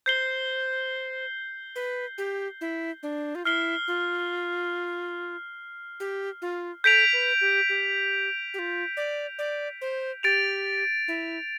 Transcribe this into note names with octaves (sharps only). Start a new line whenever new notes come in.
C5 G6 C7 G7
B4
G4
E4
D4
F4
E4 F6 C7 G7
F4
G4
F4
A4 G6 B6 D7 F7
B4
G4
G4
G4
F4
D5
D5
C5
G4 A6 D7 F7
E4